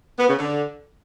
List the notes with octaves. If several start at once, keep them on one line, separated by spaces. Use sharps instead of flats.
B3
C#3
D3